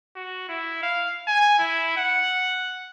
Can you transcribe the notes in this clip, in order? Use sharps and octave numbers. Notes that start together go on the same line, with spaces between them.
F#4
E4
F5
G#5
E4
F#5